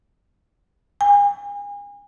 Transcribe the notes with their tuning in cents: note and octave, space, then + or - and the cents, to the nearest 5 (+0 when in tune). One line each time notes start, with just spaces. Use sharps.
G#5 -35